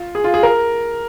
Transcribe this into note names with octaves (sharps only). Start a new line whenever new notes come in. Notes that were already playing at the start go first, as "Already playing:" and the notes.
Already playing: F4
G#4
F4
G#4
A#4